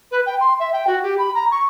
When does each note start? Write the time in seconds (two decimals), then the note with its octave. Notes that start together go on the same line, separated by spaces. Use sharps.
0.11 B4
0.26 G5
0.40 C6
0.60 E5
0.73 G5
0.87 F#4
1.03 G4
1.18 B5
1.35 A#5
1.51 C#6